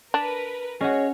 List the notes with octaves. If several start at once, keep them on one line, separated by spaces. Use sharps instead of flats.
D4 A#4 B4
C#4 F#4 G#4 C#5 D#5